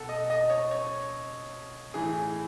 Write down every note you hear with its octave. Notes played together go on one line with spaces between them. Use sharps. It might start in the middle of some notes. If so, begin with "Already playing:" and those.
Already playing: B2 A4
D#5
D#5
C#5
C#5
A2 E3 G#4